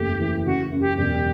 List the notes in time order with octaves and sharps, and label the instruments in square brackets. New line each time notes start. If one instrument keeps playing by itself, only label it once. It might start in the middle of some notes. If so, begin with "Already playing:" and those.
Already playing: [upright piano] F#1 E2 A3 [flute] G4
[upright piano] E3
[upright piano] C#3 [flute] F#4
[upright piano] F#2
[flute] G4
[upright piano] E1 [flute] G4